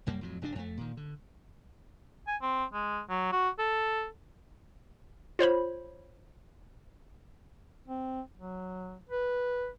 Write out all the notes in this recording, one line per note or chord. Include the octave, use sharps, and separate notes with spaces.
C2 F#2 G3 A#3
F2 A2 F#3
F1 G2 C#4 D4
F2 A3
A#2 D#3
D3
G#5
C4
G#3
F#3
F#4
A4
F4 C5 C#5 B5
C4
F#3
B4